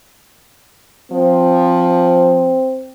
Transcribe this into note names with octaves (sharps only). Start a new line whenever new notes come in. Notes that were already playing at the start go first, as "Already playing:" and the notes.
F3 C4